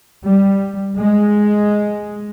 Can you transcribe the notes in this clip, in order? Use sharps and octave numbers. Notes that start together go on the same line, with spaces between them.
G3
G#3